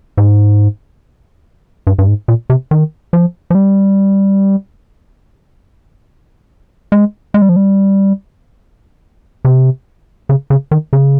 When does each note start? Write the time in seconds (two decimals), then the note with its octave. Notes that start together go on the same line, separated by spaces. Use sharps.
0.18 G#2
1.87 G2
1.98 G2
2.08 G#2
2.28 A#2
2.50 C3
2.71 D#3
3.13 F3
3.50 F3
3.55 G3
6.92 G#3
7.34 G#3
7.42 G3
7.49 F3
7.56 G3
9.45 C3
10.29 C#3
10.50 C#3
10.71 D#3
10.93 C#3